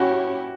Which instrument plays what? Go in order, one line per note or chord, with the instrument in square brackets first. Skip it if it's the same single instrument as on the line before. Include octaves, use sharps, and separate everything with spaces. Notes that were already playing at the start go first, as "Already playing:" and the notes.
Already playing: [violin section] C#4 E4 G4 C#5 [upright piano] F#4